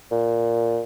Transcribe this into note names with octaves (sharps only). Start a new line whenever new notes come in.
A#2